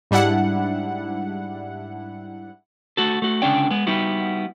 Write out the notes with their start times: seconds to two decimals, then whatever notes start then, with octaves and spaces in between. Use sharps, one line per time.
0.11 G#2 G3 D4 E4 F#5
2.97 A3 F#4 A4
3.22 A3 F#4
3.42 C#2 D3 C#4 D4 D5 G5
3.71 G#3 B3
3.87 G3 B3 D#4 E4 F#4